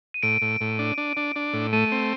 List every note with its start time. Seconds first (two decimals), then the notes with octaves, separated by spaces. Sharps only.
0.14 D#7
0.23 A2 D7
0.42 A2
0.61 A2
0.79 D4
0.98 D4
1.17 D4
1.36 D4
1.53 A2
1.73 A3 D#7
1.92 C4